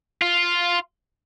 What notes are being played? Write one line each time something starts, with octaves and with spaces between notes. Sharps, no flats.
F4